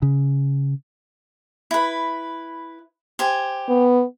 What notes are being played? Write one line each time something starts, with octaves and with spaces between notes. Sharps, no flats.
C#3
E4 B4
G4 C5 G#5
B3